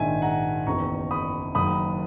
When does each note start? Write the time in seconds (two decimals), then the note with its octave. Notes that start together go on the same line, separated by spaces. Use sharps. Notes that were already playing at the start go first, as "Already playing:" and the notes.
Already playing: A#1 G#2 D#3 E5 G#5
0.22 F#5 A#5
0.67 F#1 E2 D#3 A#5 C#6
1.11 B5 D#6
1.55 F#1 F#2 D#3 B5 D#6